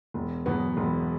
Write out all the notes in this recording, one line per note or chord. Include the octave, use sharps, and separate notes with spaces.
E1
E2 B2 F#3 B3
E1